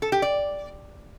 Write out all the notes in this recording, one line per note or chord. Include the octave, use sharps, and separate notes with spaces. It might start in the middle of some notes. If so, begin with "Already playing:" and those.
A4
G4
D5